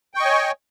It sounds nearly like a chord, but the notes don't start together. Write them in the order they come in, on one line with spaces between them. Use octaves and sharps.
G5 C#6 D#5 G#5 C#5